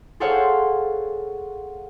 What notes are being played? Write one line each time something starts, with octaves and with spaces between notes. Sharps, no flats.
G#4 A4 C5 C#5 F5 F#5